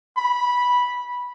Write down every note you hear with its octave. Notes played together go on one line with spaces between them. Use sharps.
B5